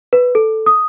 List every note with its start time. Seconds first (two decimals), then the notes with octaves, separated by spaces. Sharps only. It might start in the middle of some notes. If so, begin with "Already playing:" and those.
0.13 B4
0.35 A4
0.66 D#6